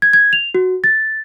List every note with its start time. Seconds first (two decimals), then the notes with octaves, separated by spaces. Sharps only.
0.02 G#6
0.13 G#6
0.33 F7
0.55 F#4
0.84 A6